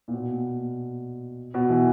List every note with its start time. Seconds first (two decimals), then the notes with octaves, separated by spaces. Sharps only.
0.08 A#2
0.13 B2
1.54 B2
1.70 E3